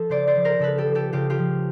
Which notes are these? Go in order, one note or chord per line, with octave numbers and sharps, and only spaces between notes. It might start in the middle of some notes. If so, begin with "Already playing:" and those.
Already playing: F3 A4
C#3 C5 D5
C5 D5
F3
A#4 C5
C#3 A4 B4
G4 A4
F3
G4 A4
C#3 F4 G4
F4 G4
F3